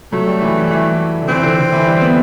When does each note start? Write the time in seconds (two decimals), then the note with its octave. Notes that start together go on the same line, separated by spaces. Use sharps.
0.12 F#3 A3
0.27 G3
0.42 E3
0.56 E3
0.70 E3
1.22 D3
1.28 E3 C4
1.43 D3
1.58 D3
1.72 E3
1.87 G3
2.01 B3